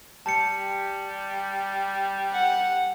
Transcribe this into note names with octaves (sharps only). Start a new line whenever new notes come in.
G3 A5 C#7
F#5